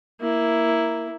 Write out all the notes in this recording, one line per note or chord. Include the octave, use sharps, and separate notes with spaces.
A#3 E4